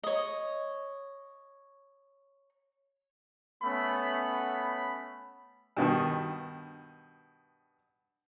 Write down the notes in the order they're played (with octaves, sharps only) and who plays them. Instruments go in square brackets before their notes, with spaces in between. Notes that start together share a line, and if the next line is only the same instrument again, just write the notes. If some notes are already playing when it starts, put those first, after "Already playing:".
[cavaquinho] C#5 D#5
[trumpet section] A3 B3 C#4 B5
[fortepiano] G2 B2 D#3